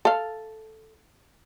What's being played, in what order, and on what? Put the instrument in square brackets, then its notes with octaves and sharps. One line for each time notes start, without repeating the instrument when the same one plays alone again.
[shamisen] A4 F5